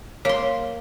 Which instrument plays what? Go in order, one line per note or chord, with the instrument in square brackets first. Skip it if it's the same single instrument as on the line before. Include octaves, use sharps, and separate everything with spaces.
[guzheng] A#3 C6 [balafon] C#5